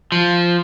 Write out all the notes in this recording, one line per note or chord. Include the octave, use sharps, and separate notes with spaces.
F3